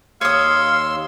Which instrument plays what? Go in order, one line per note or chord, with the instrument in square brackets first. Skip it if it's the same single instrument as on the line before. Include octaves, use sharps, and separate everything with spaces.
[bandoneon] D#2 C6 E6 [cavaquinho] C#5 D#6 [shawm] F5